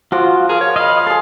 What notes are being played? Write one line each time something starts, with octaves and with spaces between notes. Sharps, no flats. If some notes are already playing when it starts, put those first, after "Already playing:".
F3 F4 F#4 D6
G#4 A#4 F5
C#5
D#5 F5 B5
G#4 A4 C6